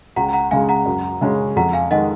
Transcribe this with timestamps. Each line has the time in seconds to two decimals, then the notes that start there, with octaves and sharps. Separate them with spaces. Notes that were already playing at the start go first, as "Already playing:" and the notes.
0.16 C#2 F#5 A#5
0.33 F#5 A#5
0.51 C#3 G#3 F5 G#5
0.69 F#5 A#5
0.86 F#2
1.21 C#3 G#3 C#4
1.56 F2 F#5 A#5
1.73 F5 G#5
1.91 D#3 G#3 D#5 F#5